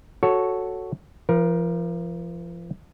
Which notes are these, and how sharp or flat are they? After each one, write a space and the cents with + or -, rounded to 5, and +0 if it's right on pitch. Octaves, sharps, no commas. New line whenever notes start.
F#4 +0 A4 +0 C#5 +0
F3 -35 A#4 +20